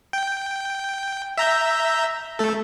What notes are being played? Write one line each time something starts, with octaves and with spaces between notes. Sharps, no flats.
G5
E5 A#5 G6
A3 A4